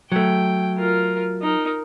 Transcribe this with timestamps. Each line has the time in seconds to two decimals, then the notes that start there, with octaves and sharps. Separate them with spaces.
0.12 F#3 A3 G5
0.78 F4 A#4
1.42 D#4 A#4